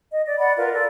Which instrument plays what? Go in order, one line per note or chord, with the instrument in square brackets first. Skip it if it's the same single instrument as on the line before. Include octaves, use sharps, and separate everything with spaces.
[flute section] D#5
D5
D5 F#5 B5
F4 A#4 B4 F5
A4 D5